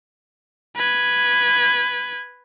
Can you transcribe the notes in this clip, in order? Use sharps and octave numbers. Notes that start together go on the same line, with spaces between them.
B4 G#6